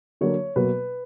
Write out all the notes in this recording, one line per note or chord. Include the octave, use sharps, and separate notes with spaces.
D3 F#3 A#3 C#5
B2 F#3 A#3 B4